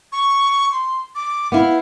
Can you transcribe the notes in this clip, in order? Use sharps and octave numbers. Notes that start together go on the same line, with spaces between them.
C#6
C6
D6
B3 E4 F5